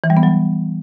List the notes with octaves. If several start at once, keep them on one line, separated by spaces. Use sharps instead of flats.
E3
G3
B3
F#3